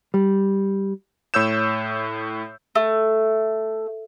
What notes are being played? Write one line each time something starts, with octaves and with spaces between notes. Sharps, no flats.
G3
A2 C#5 E6 G6 E7
A3